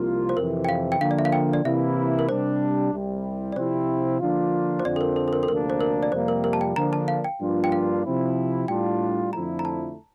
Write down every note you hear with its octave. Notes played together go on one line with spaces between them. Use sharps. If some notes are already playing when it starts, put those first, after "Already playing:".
Already playing: C2 C3 F3 A#3 F4
C5
F2 C3 E3 A#4
G5
F5
G5
D3 F3 A#3 F5
D5
E5
F5
G5
D5
C3 E3 A#3 E4 E5
A#4
C3 G3 D4 C5
C2 C3 G3
D5
C3 F3 C4 E4 C5
D3 F3 A#3 D4 F4
C5
F2 D3 F3 C4 D5
A4
A#4
A4
A4
A#4
A4
D2 C3 F3 A#3 D4 A#4
C5
A#4
D5
F2 C3 G3 A#3 C5
A#4
A#4
A5
G5
D3 F3 A#3 D4 A#5
A5
F5
G5
G2 F3 A#3 D4 F4
G5
F5
C3 F3 C4 E4
A2 G3 D4 F4 G5
F2 D3 F3 A3 E4 A#5
A#5
A5